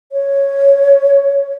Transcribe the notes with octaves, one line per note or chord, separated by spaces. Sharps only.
C#5